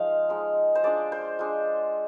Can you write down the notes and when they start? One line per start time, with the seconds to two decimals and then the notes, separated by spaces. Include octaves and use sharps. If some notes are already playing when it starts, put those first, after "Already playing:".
Already playing: F3 G#3 D#4 F4 F5
0.29 F3 G#3 D#4
0.75 C5
0.84 G#3 D4 F4 D5
1.12 C5
1.39 G#3 D4 F4